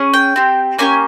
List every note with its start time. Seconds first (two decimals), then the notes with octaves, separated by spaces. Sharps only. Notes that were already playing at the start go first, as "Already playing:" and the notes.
Already playing: C#4 G#4
0.14 G5
0.36 C4 G4
0.79 A#3 C#4 G4 G#5